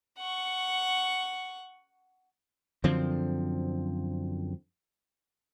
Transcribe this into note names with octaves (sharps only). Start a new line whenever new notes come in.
F#5 C#6
F#2 D3 F3 C4